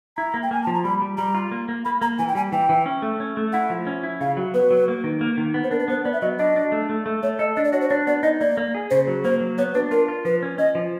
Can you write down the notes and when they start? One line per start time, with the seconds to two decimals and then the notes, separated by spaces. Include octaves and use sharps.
0.17 E4 A#5
0.34 A#3
0.43 G5
0.51 A#3 G#5
0.63 F3 A5
0.74 A#5
0.84 G3 B5
1.02 G3
1.17 G3 A#5
1.35 F4
1.51 A#3
1.69 A#3
1.85 A#3 B5
2.01 A#3 A#5
2.19 E3 G#5
2.28 G5
2.35 G3 G#5
2.52 E3 G5
2.69 E3
2.86 C#4
3.02 A3
3.20 C#4
3.37 A3
3.53 E4 F#5
3.70 F3
3.87 C#4
4.03 E4
4.20 C#3 F5
4.37 F#3
4.54 B3 B4
4.71 F#3
4.88 A#3
5.04 D#3
5.21 A#3
5.38 D#3
5.54 B3
5.64 C5
5.71 D4 A#4
5.80 B4
5.88 B3 C5
6.05 B3 D5
6.13 E5
6.21 F#3 D#5
6.39 D4 D#5
6.56 D4
6.72 A3
6.89 A3
7.06 A3
7.23 A3 C#5
7.39 A4 D#5
7.56 D4 D#5
7.64 D5
7.73 F#4 C#5
7.81 C5
7.89 D4 C#5
8.07 B3 D5
8.23 D#4 D#5
8.41 A#3 D5
8.57 A#3
8.75 G#4
8.90 C#3 C5
9.07 F#3
9.24 A#3 C5
9.41 F#3
9.58 B3 C#5
9.74 D4 B4
9.91 F4 A#4
10.08 F4
10.25 F3 B4
10.43 C#4
10.58 C#4 D#5
10.75 F3